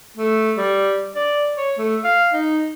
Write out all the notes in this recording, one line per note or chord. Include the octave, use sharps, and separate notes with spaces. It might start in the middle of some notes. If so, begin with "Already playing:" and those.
A3
G3
D5
C#5
A3
F5
D#4